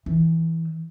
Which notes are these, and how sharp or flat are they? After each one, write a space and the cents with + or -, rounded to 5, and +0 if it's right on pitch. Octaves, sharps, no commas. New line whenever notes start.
E3 -10